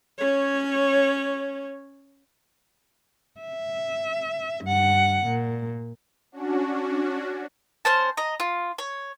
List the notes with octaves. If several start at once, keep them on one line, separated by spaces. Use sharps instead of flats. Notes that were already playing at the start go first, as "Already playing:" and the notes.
C#4 C#5
E5
G2 F#5
A#2
C#4 D4 F#4
C#4 C5 A5
D#5 A#5
F4
C#5